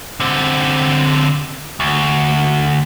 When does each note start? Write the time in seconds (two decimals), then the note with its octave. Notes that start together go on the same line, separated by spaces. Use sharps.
0.20 D3 C4
1.80 D2